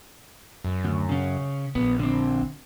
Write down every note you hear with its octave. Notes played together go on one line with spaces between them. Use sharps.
F#2
D2
C#3 C#4
A#1 B3
D3 C4